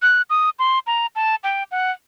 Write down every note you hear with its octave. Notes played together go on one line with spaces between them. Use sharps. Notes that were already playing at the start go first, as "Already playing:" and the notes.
F#6
D#6
C6
A#5
A5
G5
F#5